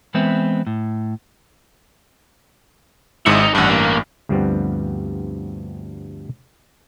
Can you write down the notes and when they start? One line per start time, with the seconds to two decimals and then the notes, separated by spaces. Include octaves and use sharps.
0.14 E3 G#3 B3 C4 B4 E5
0.67 A2
3.26 G#1 G#2 E4 D#5 C#7
3.42 D#4
3.55 A1 G2 D4 F#5
3.70 A#3
4.29 D2 G2 F3 G3 B3 C4